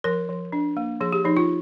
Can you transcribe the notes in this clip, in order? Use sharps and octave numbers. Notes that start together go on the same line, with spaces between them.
F3 A#4
F3
D4
A#3
F3 G#4
G4
F3 D#4
F4